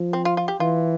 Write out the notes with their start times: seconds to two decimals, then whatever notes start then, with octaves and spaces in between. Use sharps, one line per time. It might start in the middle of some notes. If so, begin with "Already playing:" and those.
Already playing: F3
0.13 C4
0.25 F4
0.37 F4
0.48 G4
0.60 E3 F4